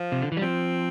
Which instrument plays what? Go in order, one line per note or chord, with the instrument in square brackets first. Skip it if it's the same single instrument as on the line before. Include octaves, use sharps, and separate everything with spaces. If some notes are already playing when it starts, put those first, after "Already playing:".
Already playing: [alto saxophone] F3
[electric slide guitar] C3
D3
E3
G3
[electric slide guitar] F3 [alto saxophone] C4